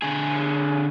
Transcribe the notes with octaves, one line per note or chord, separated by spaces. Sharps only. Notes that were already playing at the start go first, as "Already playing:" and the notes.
D3 G#4